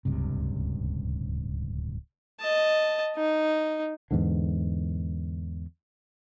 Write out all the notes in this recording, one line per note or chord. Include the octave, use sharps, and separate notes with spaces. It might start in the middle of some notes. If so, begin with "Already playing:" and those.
D1 C#2 G2 C3
D#5 A5
D#4
E2 G#2 D3